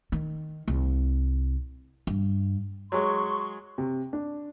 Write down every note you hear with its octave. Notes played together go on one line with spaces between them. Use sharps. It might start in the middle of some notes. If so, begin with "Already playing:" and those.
D#3
C2
G2
F#3 G#3 C6 C#6
C3
D4